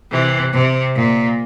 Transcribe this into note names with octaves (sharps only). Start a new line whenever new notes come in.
C3 E3
C3
A#2